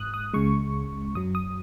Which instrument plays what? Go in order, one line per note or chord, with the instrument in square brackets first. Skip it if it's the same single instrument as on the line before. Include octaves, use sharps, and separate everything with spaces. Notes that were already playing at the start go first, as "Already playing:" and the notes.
Already playing: [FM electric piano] G#2 D#6 F#6
D#6
C#2 C#3 G#3 C#6
F#2 F#3 D#6
D#6